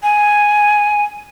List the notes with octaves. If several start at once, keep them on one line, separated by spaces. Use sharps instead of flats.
G#5